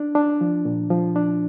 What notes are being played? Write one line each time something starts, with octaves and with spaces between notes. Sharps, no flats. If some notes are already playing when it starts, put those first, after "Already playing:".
Already playing: D4
D4
F3
A#2
F3
D4